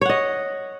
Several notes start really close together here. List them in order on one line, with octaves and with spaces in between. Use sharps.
C#5 F#5 D#5